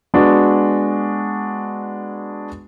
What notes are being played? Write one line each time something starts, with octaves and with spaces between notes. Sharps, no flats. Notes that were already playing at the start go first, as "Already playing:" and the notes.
G#3 B3 D4 F#4